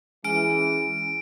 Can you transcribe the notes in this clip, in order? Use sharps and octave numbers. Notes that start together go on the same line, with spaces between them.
E3 G#3 C#4 D7